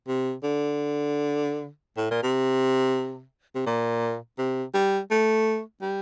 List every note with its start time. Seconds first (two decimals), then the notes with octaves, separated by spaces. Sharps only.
0.08 C3
0.43 D3
1.97 A2
2.11 A#2
2.23 C3
3.55 C3
3.66 A#2
4.38 C3
4.74 G3
5.10 A3
5.81 G3